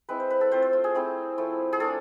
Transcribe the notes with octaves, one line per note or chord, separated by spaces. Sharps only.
G#3 C4 E4 B4
C5
B4
A4
A3 C4 F4 C5
C5
F4
G#4
A3 C4 E4
F3 A3 E4
G#4
A3 D4 F4 A4